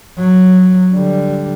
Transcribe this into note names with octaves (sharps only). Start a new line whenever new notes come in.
F#3
D3 G3